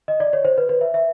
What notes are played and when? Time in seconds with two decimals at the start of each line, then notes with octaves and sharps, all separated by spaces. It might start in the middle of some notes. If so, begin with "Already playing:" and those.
0.08 D#5
0.20 D5
0.33 C#5
0.45 C5
0.58 B4
0.69 B4
0.81 E5
0.94 E5